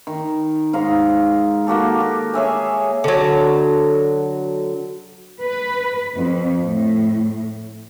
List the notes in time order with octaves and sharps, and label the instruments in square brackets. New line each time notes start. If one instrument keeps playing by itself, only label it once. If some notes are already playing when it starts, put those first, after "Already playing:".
[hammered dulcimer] D#3
G#2 D#4 F5
A#3 F#4 G4 A4
G4
G#4 C#5 E5 G#5
[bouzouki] D3 F#3
[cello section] B4
F2
A2